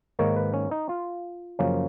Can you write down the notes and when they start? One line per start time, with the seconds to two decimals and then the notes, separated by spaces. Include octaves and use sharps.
0.19 G#2 D#3 A#3 C#5
0.37 B4
0.54 C#4
0.71 D#4
0.89 F4
1.59 F#2 C#3 F3 A#3 C#4